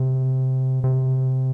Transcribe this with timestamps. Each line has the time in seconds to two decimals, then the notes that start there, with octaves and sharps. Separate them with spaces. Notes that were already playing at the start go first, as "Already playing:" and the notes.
Already playing: C3
0.84 C3